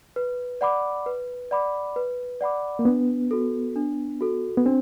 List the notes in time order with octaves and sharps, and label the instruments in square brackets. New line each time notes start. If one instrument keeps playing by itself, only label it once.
[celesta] B4
D5 F#5 B5 D6
B4
D5 F#5 B5 D6
B4
D5 F#5 B5 D6
[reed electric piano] A#3
[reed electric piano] B3 [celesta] D4
[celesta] F#4 A4
D4
F#4 A4
[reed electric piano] B3
[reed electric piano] C4 [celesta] D4